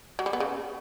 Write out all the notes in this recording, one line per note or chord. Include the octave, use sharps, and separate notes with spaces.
F#3
G3
B3
C#3